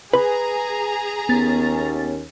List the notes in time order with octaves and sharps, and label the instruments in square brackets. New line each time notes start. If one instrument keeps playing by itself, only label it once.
[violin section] G#4 A#5 [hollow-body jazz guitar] B4 B5
[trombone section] D#2 C#4 [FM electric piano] B3 A6